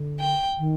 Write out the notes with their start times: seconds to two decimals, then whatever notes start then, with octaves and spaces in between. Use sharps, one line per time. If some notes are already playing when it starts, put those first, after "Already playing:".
Already playing: D3
0.19 G5
0.59 D#3